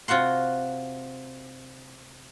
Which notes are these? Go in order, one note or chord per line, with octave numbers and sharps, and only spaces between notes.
C3 F4 F#4 F#5 C6